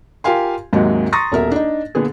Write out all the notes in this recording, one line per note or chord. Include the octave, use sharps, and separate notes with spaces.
F4 G4 A#4 F5 G#5 C6
D#2 G#2 C3 D#3 F#3 G#3
A#5 C6 C#6 D#6 A6 A#6
D#1 B2 A#4 E5
D4 D#4
A#2 D3 B3 G#4